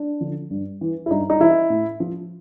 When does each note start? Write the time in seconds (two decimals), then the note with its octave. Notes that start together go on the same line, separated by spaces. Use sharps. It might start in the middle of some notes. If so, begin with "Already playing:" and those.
Already playing: D4
0.21 D3 F3
0.50 G2
0.81 E3
1.06 E4
1.11 G2 D#4
1.30 D#4
1.40 E3 E4
1.70 A2
2.00 F3